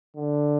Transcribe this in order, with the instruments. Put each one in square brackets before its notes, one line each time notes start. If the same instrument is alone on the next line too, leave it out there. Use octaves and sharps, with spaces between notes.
[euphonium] D3